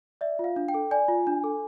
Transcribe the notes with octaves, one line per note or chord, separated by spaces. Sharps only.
D5 E5
F4
F5
D4
G5
A4
D5 G#5
F4
D4
A4